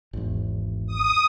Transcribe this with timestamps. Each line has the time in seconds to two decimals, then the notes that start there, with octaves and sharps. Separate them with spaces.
0.13 G#1 E2
0.87 D#6